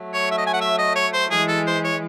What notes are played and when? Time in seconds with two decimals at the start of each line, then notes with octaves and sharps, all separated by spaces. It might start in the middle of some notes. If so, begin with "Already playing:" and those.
Already playing: F#3 A3
0.13 C#5
0.31 E5
0.38 D#5
0.47 G#5
0.53 F#5
0.61 E5
0.78 D#5
0.95 C#5
1.13 C5
1.31 E3 G#3 G#4
1.48 A4
1.67 C5
1.84 C#5